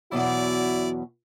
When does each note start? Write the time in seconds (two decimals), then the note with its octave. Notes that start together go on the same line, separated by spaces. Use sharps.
0.12 E2 B2 F#3 E4 F#4 D5